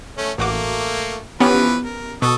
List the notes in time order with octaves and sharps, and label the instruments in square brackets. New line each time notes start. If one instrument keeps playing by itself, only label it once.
[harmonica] A3 C#4
[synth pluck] A1 F#4 D6 [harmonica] A3 A#3
[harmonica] E3 F3 B4 [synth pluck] B3 C#4 G4
[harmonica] A#4
[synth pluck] B2 [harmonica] A4 C#6 D#6